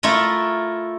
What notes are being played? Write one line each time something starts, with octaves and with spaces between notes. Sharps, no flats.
A3 E4 F4 A#4